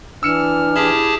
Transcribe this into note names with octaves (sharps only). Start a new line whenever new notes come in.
E3 D4 E6 F6 C#7 E7
E4 G4 G#4 A5